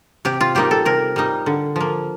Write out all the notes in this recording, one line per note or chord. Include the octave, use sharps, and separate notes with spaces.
C3 G4
F4
G3 A#3 D#4 G4
A4
C3 A#4
G3 A#3 D#4
D3
F3 A#3